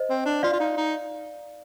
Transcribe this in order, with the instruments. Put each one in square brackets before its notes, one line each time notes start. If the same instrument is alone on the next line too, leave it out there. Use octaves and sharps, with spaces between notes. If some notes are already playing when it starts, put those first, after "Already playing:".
Already playing: [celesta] C5 D#5
[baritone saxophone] C4
D4
[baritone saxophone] F4 [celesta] D5 F5
[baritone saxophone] F4
D#4
D#4